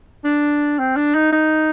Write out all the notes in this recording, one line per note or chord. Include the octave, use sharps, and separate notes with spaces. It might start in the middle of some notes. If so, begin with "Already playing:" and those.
D4
C4
D4
D#4
D#4